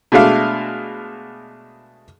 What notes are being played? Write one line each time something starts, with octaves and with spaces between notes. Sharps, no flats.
B2 G#3 A3 D4 F5